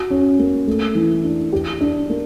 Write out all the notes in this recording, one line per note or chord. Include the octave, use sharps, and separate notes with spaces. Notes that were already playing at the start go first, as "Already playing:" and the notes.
Already playing: F#4
C#4
A#3
A3
E3
D4
G4
D4
A#3